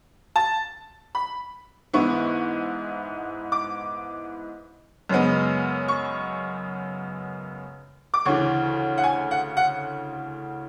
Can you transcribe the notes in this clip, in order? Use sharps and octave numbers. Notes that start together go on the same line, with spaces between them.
A5
B5
G#2 E3 B3 E4 C#6
D6
F#2 C#3 G#3 B3
C#6
D6
D2 C#3 E3 C#6
F#5
G#5
F#5
F#5